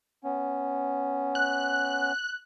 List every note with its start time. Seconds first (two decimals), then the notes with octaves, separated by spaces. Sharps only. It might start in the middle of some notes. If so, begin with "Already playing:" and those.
0.24 B3 C#4
1.35 F#6